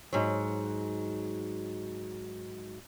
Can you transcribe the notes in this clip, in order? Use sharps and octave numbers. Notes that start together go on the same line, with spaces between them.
G#2 F#3